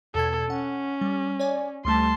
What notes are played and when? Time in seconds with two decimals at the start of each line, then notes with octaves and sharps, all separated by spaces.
0.15 E2 B2 A4 G#6
0.50 C#4 F#5
1.01 G3
1.39 C#5 D5 G#5
1.85 D2 G3 A3 A5 C6